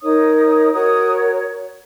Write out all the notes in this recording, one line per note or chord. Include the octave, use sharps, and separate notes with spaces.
D#4 A#4 C#5 D#6
F#4 A#4 C#5 D#6